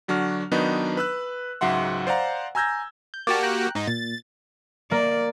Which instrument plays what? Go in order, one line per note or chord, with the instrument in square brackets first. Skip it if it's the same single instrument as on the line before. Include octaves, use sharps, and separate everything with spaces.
[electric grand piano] D3 F#3 D4 F#4 F6
D#3 F#3 B3 D4 D#4 B4
B4 E6 F#6
C#2 G#2 F#3 E5 F#5 C6
C5 D5 F5 F#5 A#5
G#5 A#5 E6 G6 G#6 A#6
[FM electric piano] G6
[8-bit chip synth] A#3 F#4 G4 [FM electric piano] D5 A5
[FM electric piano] G5 A#5 F#6
[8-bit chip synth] G#2 D#4
[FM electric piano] A#2 [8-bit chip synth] A6
[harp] A#3 [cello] D5